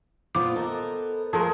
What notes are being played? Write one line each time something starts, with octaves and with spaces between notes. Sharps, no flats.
A#2 A3 B3 F4 C5 D6
A4 A#4 D#5
F3 G#3 A3 G#4 A#4 A5